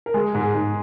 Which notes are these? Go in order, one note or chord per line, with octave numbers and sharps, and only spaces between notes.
A#4
G#3 G#4
G#2
G#4
G#2